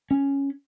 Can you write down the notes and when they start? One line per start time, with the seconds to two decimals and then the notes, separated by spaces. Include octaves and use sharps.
0.11 C#4